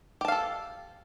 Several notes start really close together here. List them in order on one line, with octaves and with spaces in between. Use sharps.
G4 A5 F5 A4